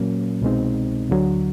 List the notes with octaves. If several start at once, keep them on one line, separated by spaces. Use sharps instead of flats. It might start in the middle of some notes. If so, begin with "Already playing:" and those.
Already playing: A#2 F#3 A#3 C#4
C2 B2 G#3 C4 D#4
D2 D3 F#3